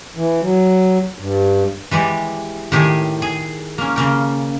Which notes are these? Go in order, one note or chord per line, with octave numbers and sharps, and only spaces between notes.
E3
F#3
G2
E3 G#3 G4 D5
A2 D#3 G4 G#4 G#5
G#4
A#3 C#4
C#3 A#3 G5